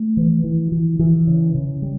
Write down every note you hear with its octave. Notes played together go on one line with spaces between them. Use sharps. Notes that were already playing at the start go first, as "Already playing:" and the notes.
Already playing: A3
E3
E3
E3
E3
C#3
C#3
G3